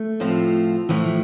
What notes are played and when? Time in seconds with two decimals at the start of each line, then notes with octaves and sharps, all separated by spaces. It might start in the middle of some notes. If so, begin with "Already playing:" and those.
Already playing: A3
0.20 A2 F3 C4 F4
0.89 A2 E3 F3 A3